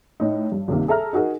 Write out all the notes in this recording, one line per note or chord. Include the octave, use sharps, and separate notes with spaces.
A2 D#4
G2
C2 G2 C3 D#3 A#3
G#4 A4 E5 A#5 F6
D#4 F#4 G#4 A#4